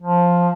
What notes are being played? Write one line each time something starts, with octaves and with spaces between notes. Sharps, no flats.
F3